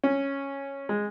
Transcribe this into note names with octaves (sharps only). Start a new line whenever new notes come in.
C#4
G#3